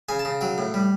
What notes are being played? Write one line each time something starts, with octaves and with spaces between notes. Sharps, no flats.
C#3 G#5
A5
C#3
F#3 G5
A2
G3